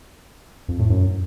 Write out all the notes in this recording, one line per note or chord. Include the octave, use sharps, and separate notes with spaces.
F2
A2
F#2